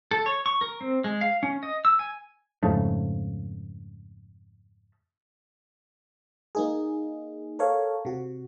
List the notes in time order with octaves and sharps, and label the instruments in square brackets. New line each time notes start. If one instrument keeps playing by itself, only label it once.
[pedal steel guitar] A4
C#5
C#6
A#4
C4
G#3
F5
C#4
D#5
E6
G#5
[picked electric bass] F2 G#2 C#3 A3
[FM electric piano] A#3 D#4 G#4
A4 A#4 C#5 F5
C3 F#4